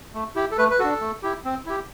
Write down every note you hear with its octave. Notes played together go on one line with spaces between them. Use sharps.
A3
E4 G4
A4
A3 B4
B4
D4 F#4 A4
A3
E4 G4
C4
E4 G4